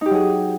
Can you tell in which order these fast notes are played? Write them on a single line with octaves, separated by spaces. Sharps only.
D#4 G4 F#3 G#4